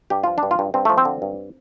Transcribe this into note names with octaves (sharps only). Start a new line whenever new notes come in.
G2 G4
F3 F4
D4
G2
F4
G2
G2 C4
F3 A3
C4
D3
G2